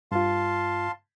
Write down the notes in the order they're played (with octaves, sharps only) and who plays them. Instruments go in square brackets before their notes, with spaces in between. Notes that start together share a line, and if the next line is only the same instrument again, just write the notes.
[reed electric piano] G2 F4 [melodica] F5 A5 C6